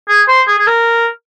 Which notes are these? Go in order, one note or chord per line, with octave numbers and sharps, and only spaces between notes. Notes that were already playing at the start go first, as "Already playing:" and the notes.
G#4
C5
G#4
G#4
A#4